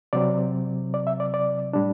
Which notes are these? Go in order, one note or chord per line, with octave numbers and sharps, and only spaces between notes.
C3 F#3 C4 D5
D5
E5
D5
D5
A2 G3 D4